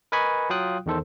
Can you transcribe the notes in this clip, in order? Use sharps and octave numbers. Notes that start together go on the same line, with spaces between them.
A#4 B4 D#5 G#5 B5 C#6
F#3 F4 F5 G5 D#6 F#6
E2 D#3 A4 C5